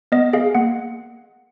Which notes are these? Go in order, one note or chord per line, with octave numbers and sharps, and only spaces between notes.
B3 D#5
G#4 F5
A#3 F#5